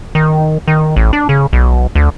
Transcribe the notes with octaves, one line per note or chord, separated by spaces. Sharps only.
D#3
D#3
A1
D4
C#3
B1
D2